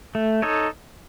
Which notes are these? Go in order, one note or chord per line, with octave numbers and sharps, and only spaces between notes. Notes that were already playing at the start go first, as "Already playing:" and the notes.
A3
D#4 A4 C#5